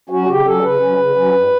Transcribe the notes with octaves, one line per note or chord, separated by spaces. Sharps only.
F#3 C#4 F#4
C#3 G4
F#3 C#4 A4
C#3 B4
F#3 C#4
C#3
F#3 C#4
G2